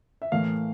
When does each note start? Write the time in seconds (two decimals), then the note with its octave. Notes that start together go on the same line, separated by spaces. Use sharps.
0.22 E5
0.32 A2 E3 A#3 F5